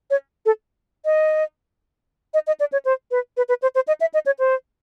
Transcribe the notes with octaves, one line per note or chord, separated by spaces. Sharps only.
C#5
A4
D#5
D#5
D#5
D5
C#5
C5
B4
B4
B4
C5
C5
D#5
E5
D#5
C#5
C5